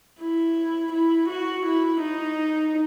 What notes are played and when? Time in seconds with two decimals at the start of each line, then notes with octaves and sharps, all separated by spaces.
0.20 E4
0.92 E4
1.28 F#4
1.66 E4
2.01 D#4